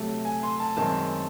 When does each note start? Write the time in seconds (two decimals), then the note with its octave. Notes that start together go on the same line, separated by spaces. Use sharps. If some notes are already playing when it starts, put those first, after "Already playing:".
Already playing: C3 F#3 A3
0.25 G#5
0.43 C6
0.60 A5
0.77 F#2 D#3 G#3 C4 A5